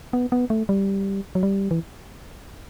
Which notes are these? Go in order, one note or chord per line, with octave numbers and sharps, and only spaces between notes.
B3
B3
A3
G3
F#3
G3
E3